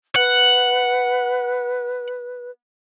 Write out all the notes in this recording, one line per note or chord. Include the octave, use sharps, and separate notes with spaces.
B4 F#5